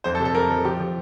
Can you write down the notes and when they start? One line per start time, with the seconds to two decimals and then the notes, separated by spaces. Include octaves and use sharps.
0.04 F2 C5
0.15 A4
0.20 C3
0.25 A4
0.35 F2 A#4
0.50 F3
0.65 F3 G4
0.80 F3